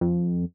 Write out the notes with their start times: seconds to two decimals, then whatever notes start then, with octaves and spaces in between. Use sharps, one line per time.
0.01 F2